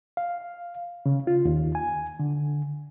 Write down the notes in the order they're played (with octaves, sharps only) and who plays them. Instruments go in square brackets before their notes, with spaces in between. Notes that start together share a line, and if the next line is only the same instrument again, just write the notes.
[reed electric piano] F5
C#3
F4
D#2
G#5
D3